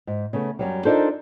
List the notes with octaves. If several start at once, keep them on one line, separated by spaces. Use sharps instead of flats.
G#2
C#3 A3 B3
F#2 F#3 G3
D4 D#4 F4 A4 A#4 C5